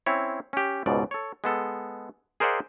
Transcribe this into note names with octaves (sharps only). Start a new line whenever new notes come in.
C4 C#4 E4 C#5
C#4 G4
C#2 G#2 B2 D5
A4 C#5
G#3 B3 A4
G#4 A#4 C5 D5 E5 F#5